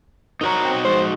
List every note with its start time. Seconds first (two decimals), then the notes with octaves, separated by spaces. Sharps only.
0.41 D#4 F#4 A#4 C5 C#5 A#5
0.64 C4
0.85 G#2 F3 G#3 C5